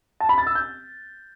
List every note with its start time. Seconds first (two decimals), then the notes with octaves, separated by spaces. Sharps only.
0.20 A5
0.29 B5
0.38 A6
0.47 E6
0.55 G6